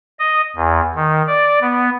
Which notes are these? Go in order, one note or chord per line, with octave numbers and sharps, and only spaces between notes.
D#5
E2
D#3
D5
B3